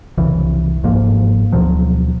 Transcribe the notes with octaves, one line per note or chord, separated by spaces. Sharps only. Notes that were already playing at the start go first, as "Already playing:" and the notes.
C2 F2 C#3 E3
G1 G#2 F3 A#3
D2 B2 F3 F#3